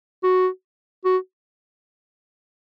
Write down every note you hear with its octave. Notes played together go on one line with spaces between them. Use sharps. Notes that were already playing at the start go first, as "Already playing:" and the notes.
F#4
F#4